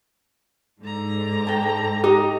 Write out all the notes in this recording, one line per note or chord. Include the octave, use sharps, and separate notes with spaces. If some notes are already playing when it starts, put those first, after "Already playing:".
G#2 D3 A#5
G5 A5
D#4 G4